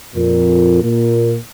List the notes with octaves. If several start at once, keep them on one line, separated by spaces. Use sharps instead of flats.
F2 A#2
A#2 A#3